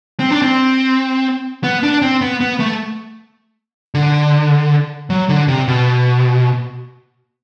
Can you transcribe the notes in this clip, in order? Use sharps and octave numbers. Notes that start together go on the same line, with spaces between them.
C4
D4
C4
B3
D4
C4
B3
B3
A3
D3
F#3
D3
C3
B2